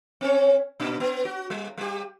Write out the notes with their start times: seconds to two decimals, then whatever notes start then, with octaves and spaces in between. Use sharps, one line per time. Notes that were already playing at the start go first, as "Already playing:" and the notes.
0.21 C4 C#4 C#5
0.80 A#2 D4
1.00 B3
1.25 F#4
1.50 G3
1.78 G3 G4